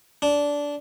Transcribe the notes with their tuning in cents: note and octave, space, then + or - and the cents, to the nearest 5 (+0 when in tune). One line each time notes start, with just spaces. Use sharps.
D4 -15